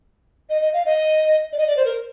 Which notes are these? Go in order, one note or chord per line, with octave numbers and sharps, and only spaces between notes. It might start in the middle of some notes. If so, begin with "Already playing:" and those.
D#5
D#5
F5
D#5
D5
D#5
D5
C5
A#4